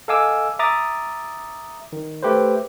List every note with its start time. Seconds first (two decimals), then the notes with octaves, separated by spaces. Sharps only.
0.08 A4 D#5 F5 G#5 D6 E6
0.59 E5 A#5 D6 D#6 A6
1.93 D#3
2.23 A3 G4 B4 C5